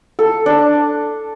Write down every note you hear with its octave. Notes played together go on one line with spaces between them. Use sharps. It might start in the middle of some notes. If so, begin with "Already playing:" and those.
A4
D4